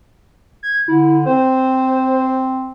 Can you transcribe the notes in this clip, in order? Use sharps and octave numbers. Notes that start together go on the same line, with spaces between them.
G#6
D3 E4
C4 C5